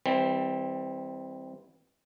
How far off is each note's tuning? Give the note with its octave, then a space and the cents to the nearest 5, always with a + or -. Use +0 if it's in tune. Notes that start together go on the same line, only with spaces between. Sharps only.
E3 -30 G3 +20 C4 +0